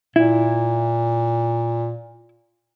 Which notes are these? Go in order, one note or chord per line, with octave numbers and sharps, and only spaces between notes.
A#2 E4